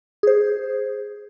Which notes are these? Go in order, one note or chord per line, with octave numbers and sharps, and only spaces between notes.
G#4 C5